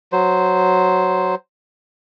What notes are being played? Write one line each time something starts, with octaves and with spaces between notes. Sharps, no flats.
F#3 C5